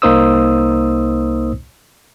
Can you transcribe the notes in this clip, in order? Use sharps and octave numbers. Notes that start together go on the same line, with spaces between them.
C2 A#3 D#4 C5 D#6 E6